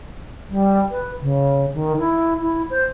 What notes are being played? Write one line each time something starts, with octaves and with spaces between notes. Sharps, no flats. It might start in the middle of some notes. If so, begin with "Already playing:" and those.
G3
B4
C#3
D#3
E4
E4
C5